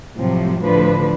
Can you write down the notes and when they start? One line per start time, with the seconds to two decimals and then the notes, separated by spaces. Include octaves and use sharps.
0.18 A2 C3 F3 F#3 C4
0.62 A2 D3 F3 B4